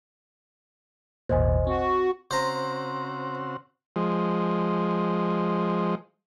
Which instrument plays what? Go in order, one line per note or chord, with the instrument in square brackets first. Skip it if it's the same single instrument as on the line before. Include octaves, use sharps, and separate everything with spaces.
[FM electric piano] G#1 D#2 A#2 [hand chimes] C5 D#5 G#5
[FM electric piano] C4 [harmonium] F#4
[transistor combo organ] C#3 C4 F#4 [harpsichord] C5 A#5
[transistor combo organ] F3 G#3